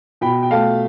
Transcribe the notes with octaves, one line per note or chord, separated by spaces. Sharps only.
B2 G5 B5
G5
A3 F5 A5